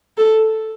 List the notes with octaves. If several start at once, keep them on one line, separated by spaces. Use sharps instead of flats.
A4